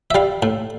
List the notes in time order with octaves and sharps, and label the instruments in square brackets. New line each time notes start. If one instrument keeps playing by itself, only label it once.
[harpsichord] E5
G3 F5
A2